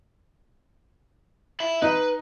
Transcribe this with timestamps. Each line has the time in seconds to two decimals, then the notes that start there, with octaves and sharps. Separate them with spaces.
1.60 E5 B5
1.82 D#4 B4